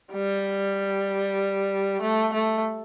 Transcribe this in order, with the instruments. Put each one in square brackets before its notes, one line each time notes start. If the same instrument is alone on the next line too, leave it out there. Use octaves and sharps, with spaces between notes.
[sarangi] G3
A3
A3